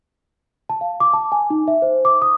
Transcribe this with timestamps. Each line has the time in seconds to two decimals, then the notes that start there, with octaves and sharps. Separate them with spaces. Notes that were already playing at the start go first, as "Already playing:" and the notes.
0.69 A5
0.81 F5
1.00 D6
1.14 A5
1.32 G#5
1.50 D#4
1.68 E5
1.82 C5
2.05 D6
2.22 D#6